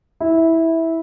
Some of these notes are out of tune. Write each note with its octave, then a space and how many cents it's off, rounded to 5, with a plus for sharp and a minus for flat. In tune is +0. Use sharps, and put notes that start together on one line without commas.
E4 -10